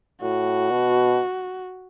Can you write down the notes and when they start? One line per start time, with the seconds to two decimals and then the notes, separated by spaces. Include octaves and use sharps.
0.22 A2 F#4
0.70 B2